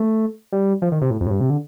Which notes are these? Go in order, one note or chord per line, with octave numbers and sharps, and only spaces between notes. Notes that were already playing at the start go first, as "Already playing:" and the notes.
Already playing: A3
G3
F3
D#3
C3
A2
F2
A2
G2
C3
D3